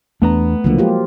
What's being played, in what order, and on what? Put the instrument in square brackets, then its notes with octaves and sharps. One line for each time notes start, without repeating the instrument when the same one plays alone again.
[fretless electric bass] E2 D4 [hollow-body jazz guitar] A3 B3 A#5
[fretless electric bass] C#2 D3 [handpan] F3 F#3 A#3
[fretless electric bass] G#3 [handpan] F4 G4